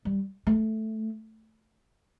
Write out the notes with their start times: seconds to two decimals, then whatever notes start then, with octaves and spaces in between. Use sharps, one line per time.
0.05 G3
0.47 A3